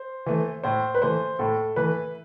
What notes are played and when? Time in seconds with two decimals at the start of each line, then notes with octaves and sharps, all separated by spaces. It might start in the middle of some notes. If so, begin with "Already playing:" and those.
Already playing: C5
0.26 E3 A3
0.63 A2 C5
0.95 B4
1.02 E3 A3 C5
1.39 A2 A4
1.76 E3 A3 B4